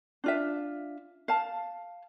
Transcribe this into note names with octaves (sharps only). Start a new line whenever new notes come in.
D4 F4 E5
F5 A5